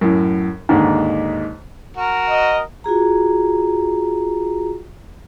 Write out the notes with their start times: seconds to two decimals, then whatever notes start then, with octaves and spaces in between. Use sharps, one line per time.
0.01 F#2 A2
0.69 D#2 G#2 D3
1.97 F#4 A#4
2.30 D#5
2.84 F4 F#4 G#4 A#5